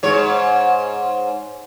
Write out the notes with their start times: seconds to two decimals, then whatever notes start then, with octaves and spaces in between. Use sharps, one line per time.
0.03 G#2 C#5